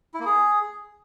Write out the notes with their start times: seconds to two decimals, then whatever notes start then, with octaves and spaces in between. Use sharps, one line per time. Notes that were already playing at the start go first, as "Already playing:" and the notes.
0.14 E4
0.20 A#3
0.26 G#4